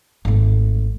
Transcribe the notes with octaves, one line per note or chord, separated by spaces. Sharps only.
G#1 A3